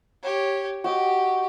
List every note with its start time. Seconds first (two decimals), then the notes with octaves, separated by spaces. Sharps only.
0.22 G4 C#5
0.84 F#4 G4 D#5